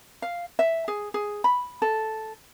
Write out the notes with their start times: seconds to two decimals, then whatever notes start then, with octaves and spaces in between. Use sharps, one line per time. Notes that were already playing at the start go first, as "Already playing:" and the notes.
0.22 F5
0.59 E5
0.88 G#4
1.14 G#4
1.44 B5
1.82 A4